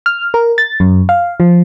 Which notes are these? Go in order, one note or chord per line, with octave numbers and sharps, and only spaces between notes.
F6
A#4
A6
F#2
F5
F3